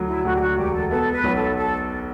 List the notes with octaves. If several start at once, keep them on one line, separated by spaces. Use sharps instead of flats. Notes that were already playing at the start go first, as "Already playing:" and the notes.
Already playing: D2 F#3
E4
D2 F#4
G4
F#4
E1 G4
A4
B3 A4
B4
B1
A4
A4